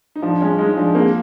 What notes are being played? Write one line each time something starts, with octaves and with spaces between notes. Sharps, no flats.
D#4
F3 D4
G#3 C#4
G#3 D#4
F3 D4
A#3 C4